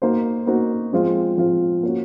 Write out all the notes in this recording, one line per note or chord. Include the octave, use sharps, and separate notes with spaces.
A#3 D#4 F#4 C5
A#3 D#4 F#4 C5
F3 G#3 C4 F4
F3 G#3 C4 F4
A#3 C#4 F#4